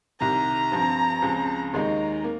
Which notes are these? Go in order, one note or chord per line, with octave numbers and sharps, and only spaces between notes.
C2 C3 D#3 A#5
G2 F3 C4
C#2 C#3 F3 C4
D#2 D#3 G#3 D#4 A#5
A#3